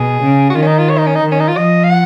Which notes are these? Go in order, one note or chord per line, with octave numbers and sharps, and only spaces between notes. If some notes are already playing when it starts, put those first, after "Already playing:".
Already playing: B2 G#4
C#3
F#4
D#3 F4
C#4
D#4
F4
C#5
D#4
C#4
D#4
D#3
C#4
D#4
F4
F3 D#5
F5
F#5